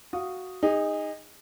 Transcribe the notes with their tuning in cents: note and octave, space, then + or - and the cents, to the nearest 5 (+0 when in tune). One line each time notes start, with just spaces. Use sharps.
F#4 +0 F5 +0 D#6 +0
D#4 +0 G#4 -30